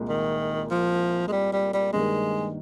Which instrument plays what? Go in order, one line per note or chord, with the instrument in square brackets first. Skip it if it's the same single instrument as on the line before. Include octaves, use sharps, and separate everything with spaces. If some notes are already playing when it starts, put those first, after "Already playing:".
Already playing: [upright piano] C2 A#2 G#3
[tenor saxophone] D#3
F3
G#3
G3
G3
G3
[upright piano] G2 D#3 A#3 [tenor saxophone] G#3